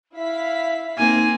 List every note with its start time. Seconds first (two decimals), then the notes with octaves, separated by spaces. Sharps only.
0.16 E4 E5 F5 B6
0.97 A#3 C4 D#4 G#5